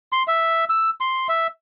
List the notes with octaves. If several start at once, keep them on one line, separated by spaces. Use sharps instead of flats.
C6
E5
E6
C6
E5